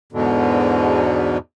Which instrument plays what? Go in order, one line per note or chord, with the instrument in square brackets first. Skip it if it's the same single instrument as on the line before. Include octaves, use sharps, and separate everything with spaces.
[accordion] E2 G#2 B2 D3